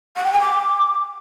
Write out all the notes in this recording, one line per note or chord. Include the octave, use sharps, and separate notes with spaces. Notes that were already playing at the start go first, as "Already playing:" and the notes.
F#5
G5
G#5
D6